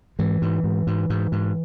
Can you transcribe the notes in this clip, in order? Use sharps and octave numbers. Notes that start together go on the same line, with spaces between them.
G#2 E3
G#2
G#2
G#2
G#2
G#2